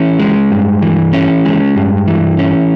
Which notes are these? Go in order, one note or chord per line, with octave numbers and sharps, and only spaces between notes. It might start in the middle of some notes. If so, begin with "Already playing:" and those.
Already playing: E3 C#4
G#3
G2
E3
C#4
G#3
G2
E3
C#4